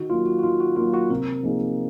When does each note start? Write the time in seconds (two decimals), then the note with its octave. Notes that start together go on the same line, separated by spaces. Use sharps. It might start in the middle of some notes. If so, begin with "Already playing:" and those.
Already playing: D#3 F#4
0.10 F#3 A#3 F4
0.26 F#4
0.39 F#4
0.43 D#3 F4
0.60 F#4
0.76 F#3 A#3 F4
0.94 F#4
1.10 C3 A#4
1.43 F3 A#3 D#4 G#4